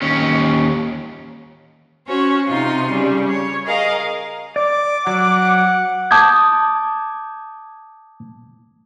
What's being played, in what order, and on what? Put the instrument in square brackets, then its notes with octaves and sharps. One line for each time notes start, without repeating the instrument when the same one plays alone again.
[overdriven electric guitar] D#2 C#4
[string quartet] C#4 F#4 C5 C#5
C3 D#4 F4 C6
C#3 G3
C#5
G#4 A#4 D#5 F5
[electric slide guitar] D5 [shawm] D6
[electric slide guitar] F#3 [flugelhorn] F#5
[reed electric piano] A5 D6 D#6 G6 G#6